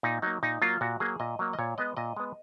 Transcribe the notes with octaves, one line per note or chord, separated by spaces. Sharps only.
A#2 D#4
F#3 A#3 D#4
A#2 D#4
F#3 A#3 F4
A#2 F#4
F#3 A#3 G#4
A#2 D#5
F#3 A#3
D#5
A#2 C#5
G#3 B3 D#5
A#2 D#5
G#3 B3